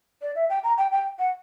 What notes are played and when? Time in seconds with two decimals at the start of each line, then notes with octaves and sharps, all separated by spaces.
0.22 D5
0.35 E5
0.50 G5
0.64 A#5
0.78 G5
0.92 G5
1.19 F#5